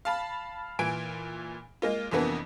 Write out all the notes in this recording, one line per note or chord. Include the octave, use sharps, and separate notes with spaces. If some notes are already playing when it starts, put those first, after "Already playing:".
F5 A5 B5
A#2 E3 G#5 D7
G#3 A#3 F4
F2 C3 E3 A#3 B3 D4